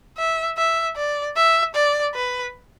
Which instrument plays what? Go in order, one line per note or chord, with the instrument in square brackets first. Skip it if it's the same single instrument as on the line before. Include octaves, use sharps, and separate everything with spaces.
[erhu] E5
E5
D5
E5
D5
B4